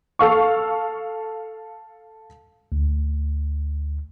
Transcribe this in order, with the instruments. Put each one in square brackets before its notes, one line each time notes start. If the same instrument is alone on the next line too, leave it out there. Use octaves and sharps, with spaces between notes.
[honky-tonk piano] A4 F5 C#6
[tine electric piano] D2